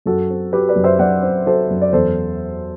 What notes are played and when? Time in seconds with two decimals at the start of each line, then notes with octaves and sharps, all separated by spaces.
0.06 F#2 F#4 A4
0.30 C4
0.52 F#3 G4 B4
0.69 B4 D5
0.76 F#2
0.84 C5 E5
0.99 F#2 D5 F#5
1.23 C4
1.46 F#3 A4 C5
1.70 F#2
1.81 D5
1.92 E2 A4 C5